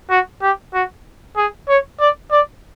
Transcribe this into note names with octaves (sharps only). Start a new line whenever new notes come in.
F#4
G4
F#4
G#4
C#5
D5
D5